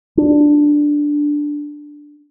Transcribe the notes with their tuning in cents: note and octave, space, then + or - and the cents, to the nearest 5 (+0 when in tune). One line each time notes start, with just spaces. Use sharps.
D4 +5